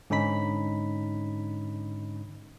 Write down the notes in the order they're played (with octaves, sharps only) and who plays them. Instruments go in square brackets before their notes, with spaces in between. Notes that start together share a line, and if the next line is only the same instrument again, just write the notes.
[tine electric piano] G#2 D3 C#4 D#4 B5 B6